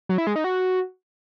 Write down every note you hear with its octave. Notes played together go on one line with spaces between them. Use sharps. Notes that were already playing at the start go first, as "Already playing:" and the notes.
F#3
E4
G#3
D#4
F#4